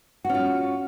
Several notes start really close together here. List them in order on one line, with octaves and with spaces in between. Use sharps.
F#4 C#4 F4